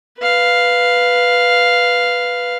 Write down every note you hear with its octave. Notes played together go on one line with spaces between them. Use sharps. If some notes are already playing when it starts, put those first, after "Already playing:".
B4 F5